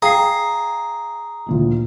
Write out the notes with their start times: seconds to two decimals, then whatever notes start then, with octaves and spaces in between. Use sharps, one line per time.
0.02 G#4 F5 G5 A#5 C7
1.46 D2 A#2 E3